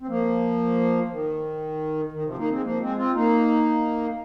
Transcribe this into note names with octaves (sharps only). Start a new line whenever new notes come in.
C4
F3 A#3
F3
D#3
D#3
C3 F3
A#3 D#4
G#3 C4
F3 A#3
G#3 C4
C4 F4
A#3 D#4